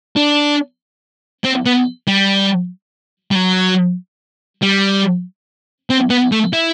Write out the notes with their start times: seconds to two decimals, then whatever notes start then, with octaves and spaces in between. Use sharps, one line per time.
0.17 D4
1.44 C4
1.65 B3
2.08 G3
3.31 G3
3.35 F#3
4.62 G3
5.90 C4
6.10 B3
6.32 A3
6.53 E4